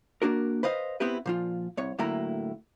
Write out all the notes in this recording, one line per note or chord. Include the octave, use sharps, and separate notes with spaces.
A#3 D4 F#4 A#4
B4 C5 D#5 F5
B3 C4 E4 G4 B4
A#2 F3 F4
C2 C3 C#5
D2 A2 F#3 A#3 E4 A#5